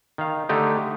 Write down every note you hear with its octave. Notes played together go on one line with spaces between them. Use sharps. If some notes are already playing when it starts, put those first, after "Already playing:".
D#3 F5
D3 A3 D#4 G4